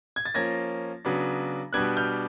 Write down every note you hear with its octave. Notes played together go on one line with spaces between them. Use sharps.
G#6
A6
F3 A#3 C#4 G#6 A#6
C#3 F#3 B3 D4
B2 G3 B3 D4 F#6 G#6
F6 G6